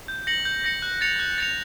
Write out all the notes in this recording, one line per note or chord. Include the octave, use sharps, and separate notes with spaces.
G6
A#6 C#7 F#7
G6
A#6 C#7 F#7
F#6
A6 C#7 F7
F#6
A6 C#7 F7